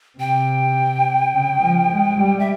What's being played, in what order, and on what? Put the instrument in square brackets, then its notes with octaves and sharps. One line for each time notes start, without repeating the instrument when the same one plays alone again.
[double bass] C3 [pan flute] G5
[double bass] C#3
F3
G#3
G3
[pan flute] E5